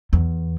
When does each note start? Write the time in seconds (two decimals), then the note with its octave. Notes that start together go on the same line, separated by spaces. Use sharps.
0.13 E2